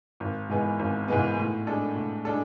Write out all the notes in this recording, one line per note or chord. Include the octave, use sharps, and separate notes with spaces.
G#1
G#2 E3 G#3 B3
G#1
G#2 E3 G#3 B3
A2
G#3 D4 A4
A2
G#3 D4 A4